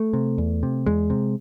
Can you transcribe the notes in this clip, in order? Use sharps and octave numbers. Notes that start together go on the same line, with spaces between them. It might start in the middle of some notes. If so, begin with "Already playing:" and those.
Already playing: A3
C3
E2
C3
E2 G#3
C3